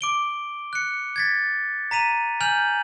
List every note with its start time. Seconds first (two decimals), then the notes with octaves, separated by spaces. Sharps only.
0.01 D6 D7 G7
0.73 F#6 C#7
1.16 G#6 A6 B6
1.91 A#5 B6 D#7 F7
2.41 G#5 F6 G6 F7 F#7